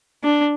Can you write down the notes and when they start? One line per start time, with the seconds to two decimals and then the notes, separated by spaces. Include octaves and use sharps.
0.24 D4